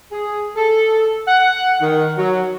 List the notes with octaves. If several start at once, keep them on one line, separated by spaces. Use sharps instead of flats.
G#4
A4
F#5
D#3
F#3